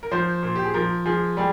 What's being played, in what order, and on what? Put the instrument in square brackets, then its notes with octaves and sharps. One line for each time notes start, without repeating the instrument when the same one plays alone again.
[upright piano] A#4
[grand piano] F3 [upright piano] C5
[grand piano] A#2
[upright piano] G4
G#4
[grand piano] F3 [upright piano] A#4
[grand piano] F3 [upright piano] G#4
[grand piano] G3 [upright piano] G#4